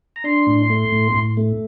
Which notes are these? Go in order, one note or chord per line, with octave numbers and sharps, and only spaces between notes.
A#5
D4 C6
A2
A3
A2
A2
A3